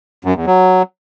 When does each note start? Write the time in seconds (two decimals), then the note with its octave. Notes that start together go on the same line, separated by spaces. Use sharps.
0.24 F#2
0.35 E2
0.46 F#3